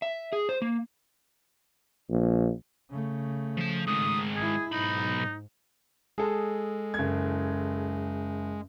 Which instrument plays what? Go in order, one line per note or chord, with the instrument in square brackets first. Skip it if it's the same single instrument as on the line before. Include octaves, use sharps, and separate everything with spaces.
[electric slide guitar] E5
G#4
C5
A#3
[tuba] A#1
[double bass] C#3 A3
[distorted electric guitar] F3 A5
[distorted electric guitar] G#2 D#3 [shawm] D#6
[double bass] G#3 E4 [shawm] G#4
[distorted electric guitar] B1 B5 [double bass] G#2 [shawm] D#4
[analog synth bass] G#3 [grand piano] G#4 A4
[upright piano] F#1 G#6